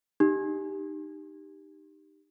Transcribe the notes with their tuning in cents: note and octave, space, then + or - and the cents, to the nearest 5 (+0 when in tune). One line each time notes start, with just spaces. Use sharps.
D#4 -15 G4 +0